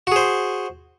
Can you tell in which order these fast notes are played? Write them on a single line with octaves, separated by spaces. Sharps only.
F#4 G#4 C5